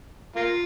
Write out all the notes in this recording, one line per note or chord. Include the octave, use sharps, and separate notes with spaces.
A#3 F4